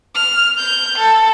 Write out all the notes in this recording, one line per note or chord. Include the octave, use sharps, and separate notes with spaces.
F6
G6
A4